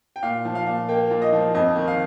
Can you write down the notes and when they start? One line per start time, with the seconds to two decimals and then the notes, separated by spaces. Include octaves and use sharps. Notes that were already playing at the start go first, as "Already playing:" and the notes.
0.16 G5
0.23 A#2 F5
0.45 F3
0.55 F5
0.66 A#2
0.89 A#3 G5
1.10 A#2
1.22 D#5
1.33 F3
1.54 F2 D#5
1.76 D#3
1.88 F5